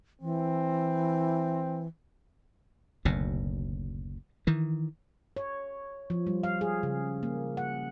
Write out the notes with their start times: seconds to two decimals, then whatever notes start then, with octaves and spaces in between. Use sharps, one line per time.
0.21 E3 C4
3.05 F#1 D2 B2
4.47 D#3 E3
5.37 C#5
6.10 F3
6.27 G3
6.43 F5
6.61 G#4
6.83 C#3
7.23 A#3
7.57 F#5